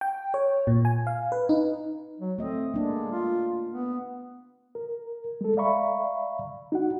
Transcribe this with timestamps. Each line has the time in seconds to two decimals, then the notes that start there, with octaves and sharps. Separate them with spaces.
0.01 G5
0.34 C#5
0.67 A#2
0.85 G#5
1.07 F5
1.32 B4
1.49 D#4
2.20 F#3
2.39 A3 C4 D#5
2.74 G#3 A#3 D4
3.11 F4
3.70 B3
4.75 A#4
5.41 G#3 A4
5.57 D5 E5 F5 A#5 B5 C#6
6.72 D#4 F#4 F#5